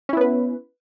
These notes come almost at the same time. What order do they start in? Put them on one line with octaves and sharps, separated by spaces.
C#4 E4 B3 B4